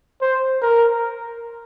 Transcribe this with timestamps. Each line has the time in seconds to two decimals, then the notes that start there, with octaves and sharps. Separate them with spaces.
0.21 C5
0.62 A#4